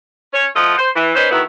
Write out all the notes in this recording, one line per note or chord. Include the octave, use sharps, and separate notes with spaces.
C#4 C#5
F3 A3 F4 D#5 F#5
C5
E3
C#4 D#4 B4 C5
D#3 A3 B3 E4 F#4